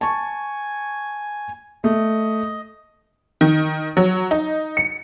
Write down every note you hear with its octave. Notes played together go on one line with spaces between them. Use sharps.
G#5 A5 C#6
A3 D#5
D#3
F#3
D#4
C#7